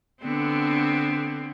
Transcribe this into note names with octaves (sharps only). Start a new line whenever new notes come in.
D3 B3 C4